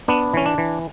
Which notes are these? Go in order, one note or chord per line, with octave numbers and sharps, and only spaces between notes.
B3 D4
E3 C#4
D4
E3